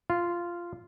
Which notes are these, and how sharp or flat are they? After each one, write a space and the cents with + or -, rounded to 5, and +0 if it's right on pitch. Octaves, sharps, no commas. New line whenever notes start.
F4 -10